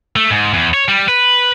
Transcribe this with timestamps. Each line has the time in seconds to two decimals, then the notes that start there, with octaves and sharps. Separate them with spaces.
0.16 A3
0.31 G#2
0.53 E2
0.74 C#5
0.88 G3
1.08 B4